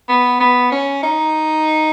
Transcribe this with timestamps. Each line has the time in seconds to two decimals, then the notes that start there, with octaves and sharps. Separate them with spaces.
0.09 B3
0.40 B3
0.72 C#4
1.03 D#4